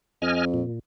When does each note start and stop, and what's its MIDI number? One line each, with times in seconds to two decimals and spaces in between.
0.22 0.62 41
0.22 0.45 75
0.22 0.45 80
0.22 0.45 89
0.54 0.79 46